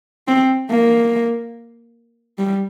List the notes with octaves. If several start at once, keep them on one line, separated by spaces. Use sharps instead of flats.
C4
A#3
G3